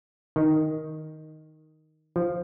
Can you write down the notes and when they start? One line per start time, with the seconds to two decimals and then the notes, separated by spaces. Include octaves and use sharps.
0.36 D#3
2.16 F3